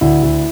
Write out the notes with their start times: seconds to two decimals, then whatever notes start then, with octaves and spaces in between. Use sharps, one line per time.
0.01 D2 E4
0.23 D2